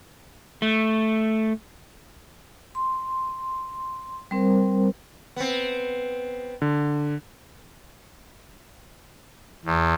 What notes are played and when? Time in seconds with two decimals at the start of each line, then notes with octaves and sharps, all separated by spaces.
0.62 A3
2.75 C6
4.31 G3 C4 A#4 C5
5.36 B3 C4
6.62 D3
9.65 E2